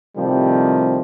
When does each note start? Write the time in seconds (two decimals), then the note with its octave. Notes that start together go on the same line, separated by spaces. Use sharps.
0.17 A2 C3 D#3 F3 G3